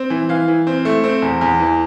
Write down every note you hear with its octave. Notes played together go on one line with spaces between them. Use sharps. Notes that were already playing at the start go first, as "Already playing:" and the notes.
Already playing: C4
E3
E3 F5
E3
C4
A3
C4
E2
E2
E3